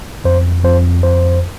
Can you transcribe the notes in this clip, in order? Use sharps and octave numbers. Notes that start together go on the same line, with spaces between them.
F2 C5
F2 C5
F2 C5